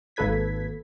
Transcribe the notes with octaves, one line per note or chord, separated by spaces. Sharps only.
G#1 A#3 A4 B4 G#6 B6